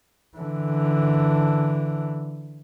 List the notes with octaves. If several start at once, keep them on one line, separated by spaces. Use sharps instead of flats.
D3 E3